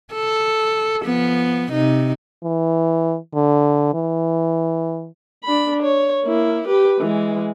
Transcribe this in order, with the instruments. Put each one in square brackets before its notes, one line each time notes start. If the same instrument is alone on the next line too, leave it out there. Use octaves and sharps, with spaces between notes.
[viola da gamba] A4
F3 B3
C3 D#4
[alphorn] E3
D3
E3
[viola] D4 B5
C#5
A#3 E4
G4 B4
E3 G#3